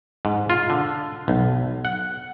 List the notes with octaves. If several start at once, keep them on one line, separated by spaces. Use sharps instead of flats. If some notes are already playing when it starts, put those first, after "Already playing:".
G#2
F4
D3
B1
F#5